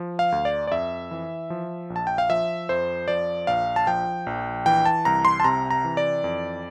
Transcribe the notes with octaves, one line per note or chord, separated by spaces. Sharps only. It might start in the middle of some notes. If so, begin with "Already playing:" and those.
Already playing: F3
F5
D2
D5
D5
F2 E5
E3
F3
A#1
A5
G5
F5
F3 E5
F2 C5
F3 D5
A#1 F5
A5
F3 G5
A#1
E3 G5
A5
C2 A#5
C6
A5
C3 A#5
A#5
E3
D5
F2